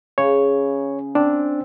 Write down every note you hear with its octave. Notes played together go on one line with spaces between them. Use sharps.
C#3 C#5
C4 D4